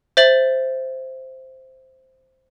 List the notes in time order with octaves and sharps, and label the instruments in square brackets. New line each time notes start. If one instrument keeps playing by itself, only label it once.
[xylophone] C5 E5 A6 F#7